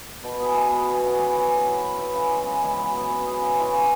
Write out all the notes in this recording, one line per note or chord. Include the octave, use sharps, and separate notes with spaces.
B2
B3 G#4
B2
B3 G#4
E3
C#4 F#4 C#5
E3
C#4 F#4 C#5
F#3
E4 B4
F#3
E4 B4
C#3
E3 G#3
C#3
E3 G#3
F#3
B3 G#4
F#3
B3 G#4
C#3
G#3 E4 C#5
C#3